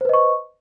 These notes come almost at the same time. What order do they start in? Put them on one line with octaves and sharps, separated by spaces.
C5 B4 D#5 C#6